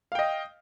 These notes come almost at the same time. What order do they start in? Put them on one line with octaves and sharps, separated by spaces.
F5 G5 D#5